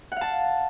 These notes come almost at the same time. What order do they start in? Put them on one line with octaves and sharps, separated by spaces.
F#5 F5 A5